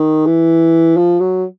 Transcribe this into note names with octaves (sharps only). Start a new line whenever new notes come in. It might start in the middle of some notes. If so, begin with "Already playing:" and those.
Already playing: D#3
E3
F3
F#3